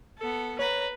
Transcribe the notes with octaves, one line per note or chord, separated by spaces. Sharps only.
B3 A4
B4 C#5 A#5